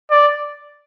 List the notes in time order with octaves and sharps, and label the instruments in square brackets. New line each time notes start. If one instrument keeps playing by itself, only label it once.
[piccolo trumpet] D5